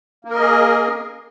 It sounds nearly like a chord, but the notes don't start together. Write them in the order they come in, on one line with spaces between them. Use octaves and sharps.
A#3 A#4 D#5 G#4